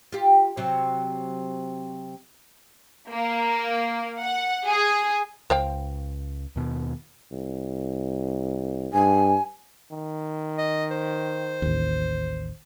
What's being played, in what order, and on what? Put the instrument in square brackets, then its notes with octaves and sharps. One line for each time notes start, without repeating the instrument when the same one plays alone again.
[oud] F4 G4
C3 F#3 C4
[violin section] A#3
F#5
G#4
[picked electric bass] C#2 [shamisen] C5 F5 G5
[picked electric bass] D#2 B2
[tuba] C2
[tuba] G2 [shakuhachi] G#5
[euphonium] D#3
[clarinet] D#5
C5
[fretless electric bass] A1 D#2